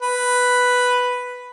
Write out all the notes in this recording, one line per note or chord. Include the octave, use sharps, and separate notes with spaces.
B4